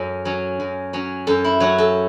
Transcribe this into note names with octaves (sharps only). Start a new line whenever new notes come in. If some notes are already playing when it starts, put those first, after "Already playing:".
Already playing: F#2 C#4 A4
F#3 C#4
F#2
F#3 C#4
F#2 A4
E4
F#3 C#4 F#4
A4